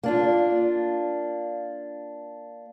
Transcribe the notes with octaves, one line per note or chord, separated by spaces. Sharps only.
A#3 D4 F4